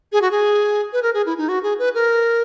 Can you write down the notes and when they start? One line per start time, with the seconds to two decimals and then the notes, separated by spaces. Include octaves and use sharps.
0.12 G#4
0.22 F#4
0.31 G#4
0.93 B4
1.03 A#4
1.14 G#4
1.26 E4
1.38 D#4
1.49 F#4
1.63 G#4
1.79 B4
1.95 A#4